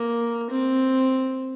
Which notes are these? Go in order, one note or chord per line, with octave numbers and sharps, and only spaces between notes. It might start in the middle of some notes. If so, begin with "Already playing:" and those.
Already playing: A#3
C4